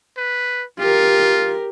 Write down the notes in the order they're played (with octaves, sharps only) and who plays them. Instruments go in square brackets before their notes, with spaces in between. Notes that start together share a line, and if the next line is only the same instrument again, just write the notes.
[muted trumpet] B4
[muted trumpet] F4 [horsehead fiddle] G4 A#4